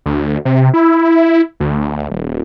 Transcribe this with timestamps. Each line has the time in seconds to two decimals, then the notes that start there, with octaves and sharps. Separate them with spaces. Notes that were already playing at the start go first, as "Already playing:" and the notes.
0.06 D2
0.45 C3
0.74 E4
1.60 D2
2.11 D#1